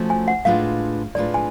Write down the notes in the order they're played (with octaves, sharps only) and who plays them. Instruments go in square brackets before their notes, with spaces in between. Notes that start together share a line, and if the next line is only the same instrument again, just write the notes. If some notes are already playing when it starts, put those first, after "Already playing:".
Already playing: [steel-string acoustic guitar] F3 A3 C#4 F#4
[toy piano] G#5
F#5
[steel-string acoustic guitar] A2 G#3 D4 F4 B4 [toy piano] F5
[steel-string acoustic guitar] A2 G#3 D4 F4 B4 [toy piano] D5
[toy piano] G#5